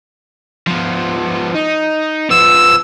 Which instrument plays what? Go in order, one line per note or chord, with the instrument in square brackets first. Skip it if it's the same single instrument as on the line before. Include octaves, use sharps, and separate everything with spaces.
[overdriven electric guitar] F3 B3
D#4
[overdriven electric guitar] F3 B3 [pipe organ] E6